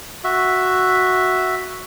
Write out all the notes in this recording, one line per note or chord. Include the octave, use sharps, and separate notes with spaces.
F#4 E5